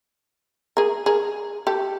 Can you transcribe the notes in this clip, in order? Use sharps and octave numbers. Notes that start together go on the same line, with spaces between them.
G#4 A#4
G#4 A#4
G4 A4